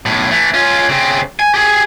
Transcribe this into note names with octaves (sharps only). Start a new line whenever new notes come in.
B1 A2
E3 A3
C#4 F4
C#3 C4
G#5
G4 G#4